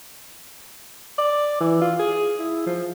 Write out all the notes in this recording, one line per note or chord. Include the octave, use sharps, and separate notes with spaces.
D5
E3
F4
G#4
E4
F3